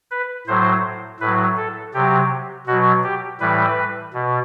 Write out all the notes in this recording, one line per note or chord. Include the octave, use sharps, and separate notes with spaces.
B4
A2 F#3 C5
A2 F#3 B4
A4
C3 F#3 G4
B2 F#3 F#4
G4
A2 E3 G3 B4
B2